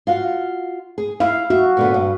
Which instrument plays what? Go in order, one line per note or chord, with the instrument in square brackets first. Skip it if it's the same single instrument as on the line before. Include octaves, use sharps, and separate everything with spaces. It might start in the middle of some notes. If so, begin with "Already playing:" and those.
[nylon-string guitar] F4 F#4 F5
G#4
[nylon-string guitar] E4 [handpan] F5
[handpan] F#4 [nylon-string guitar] E5
[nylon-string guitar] A#2 D3 B3
G2